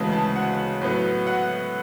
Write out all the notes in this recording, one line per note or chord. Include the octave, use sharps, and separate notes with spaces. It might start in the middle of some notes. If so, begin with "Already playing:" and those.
Already playing: D2 C#3 E3 G#3 B3 A5
A5
F#5
A2 F#3 B3
F#5